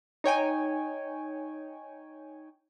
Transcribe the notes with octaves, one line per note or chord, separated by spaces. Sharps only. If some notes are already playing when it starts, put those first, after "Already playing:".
D#4 C#5 G5 G#5